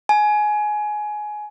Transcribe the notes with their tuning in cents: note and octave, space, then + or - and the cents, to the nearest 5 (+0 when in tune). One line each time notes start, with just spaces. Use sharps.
G#5 +20